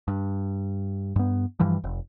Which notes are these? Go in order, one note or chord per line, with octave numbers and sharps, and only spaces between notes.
G2
G2 B3
G2 E3 F3 G3
F1